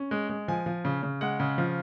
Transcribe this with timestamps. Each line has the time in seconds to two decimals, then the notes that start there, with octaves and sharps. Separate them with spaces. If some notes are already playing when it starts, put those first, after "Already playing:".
Already playing: C#4
0.11 G#3
0.29 G#3
0.48 F3 G#5
0.66 F3
0.85 C#3
1.03 C#3
1.21 G#3 F#5
1.40 C#3
1.58 F3